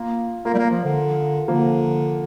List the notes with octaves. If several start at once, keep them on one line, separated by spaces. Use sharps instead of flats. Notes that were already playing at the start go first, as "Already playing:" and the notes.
Already playing: A#3 F4
A#3 F4 A#4
G3
A#3
F3
D3
D3 F3 A#3